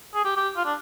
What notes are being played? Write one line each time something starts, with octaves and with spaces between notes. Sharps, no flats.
G#4
G4
G4
F4
D4